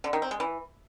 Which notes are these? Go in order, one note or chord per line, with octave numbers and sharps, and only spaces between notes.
D3
D#3
C4
G#3
E3